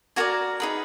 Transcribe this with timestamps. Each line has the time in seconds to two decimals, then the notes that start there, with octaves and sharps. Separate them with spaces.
0.16 F#4 A#4 D5 G#5 A#5
0.60 D#4 G#4 B4